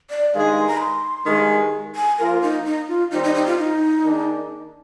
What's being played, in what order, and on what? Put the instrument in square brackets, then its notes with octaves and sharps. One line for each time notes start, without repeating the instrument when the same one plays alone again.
[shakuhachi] D5
[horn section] G2 D#3 G#3 D#4 G#4 [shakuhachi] F5
[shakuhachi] C6
A#5
C6
[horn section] G2 D#3 G#3
[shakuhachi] G#5
[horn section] F3 A#3 F4 [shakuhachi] A#4
[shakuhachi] D#4
D#4
F4
[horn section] D#3 G3 C4 [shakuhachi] D#4
[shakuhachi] D#4
D#4
F4
D#4
[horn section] D#3 A#3 D4 G#4